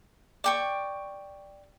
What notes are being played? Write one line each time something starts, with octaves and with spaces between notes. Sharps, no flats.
D5 G5 C#6